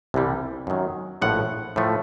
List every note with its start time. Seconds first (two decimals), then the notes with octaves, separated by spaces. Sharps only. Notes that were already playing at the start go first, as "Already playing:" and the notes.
0.14 C2 C3 E3 G3
0.67 F#2 D#3 F#3
1.22 A#1 A2 F3 F#5
1.76 A2 F3 A3